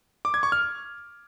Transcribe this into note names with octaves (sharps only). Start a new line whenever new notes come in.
D6
G#6
C#6
F6